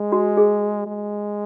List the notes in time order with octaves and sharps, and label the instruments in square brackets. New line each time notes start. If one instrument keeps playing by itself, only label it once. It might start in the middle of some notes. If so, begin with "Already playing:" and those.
Already playing: [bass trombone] G#3
[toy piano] F#4
G#4
[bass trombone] G#3